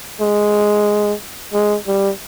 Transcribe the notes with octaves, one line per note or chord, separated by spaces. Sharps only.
G#3
G#3
G3